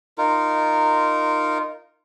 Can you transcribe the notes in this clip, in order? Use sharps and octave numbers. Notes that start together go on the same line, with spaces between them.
D#4 F4 A#4